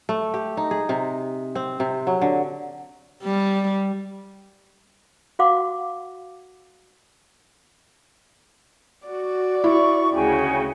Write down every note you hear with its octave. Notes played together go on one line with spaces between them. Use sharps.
A3
G4
D#4
G#4
C3
C4
C3
F#3
D3
G3
F#4 F5 F#5 C6 D6
F#4 D5
E4 C#6
D2 C#3 F#4 G5 G#5